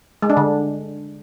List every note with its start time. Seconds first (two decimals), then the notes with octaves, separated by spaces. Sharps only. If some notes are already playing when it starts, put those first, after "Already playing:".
0.22 G#3
0.30 D4
0.37 D3